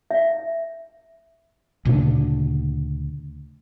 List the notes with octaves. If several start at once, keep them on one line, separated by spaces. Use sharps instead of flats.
E5
D2 A#2 C#3 D4